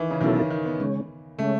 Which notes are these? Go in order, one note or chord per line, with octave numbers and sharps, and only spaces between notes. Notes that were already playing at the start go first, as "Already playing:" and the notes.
Already playing: D#3 E3
C#3
B2 D#3 F#3 C#4 E4 A4
C#3
D#3
B3
C#3 G#3 C#4
C#3 G#3 A3 C#4